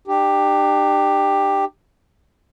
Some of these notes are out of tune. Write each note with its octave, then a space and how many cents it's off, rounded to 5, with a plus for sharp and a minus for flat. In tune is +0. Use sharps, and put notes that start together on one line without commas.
D4 +45 G4 +10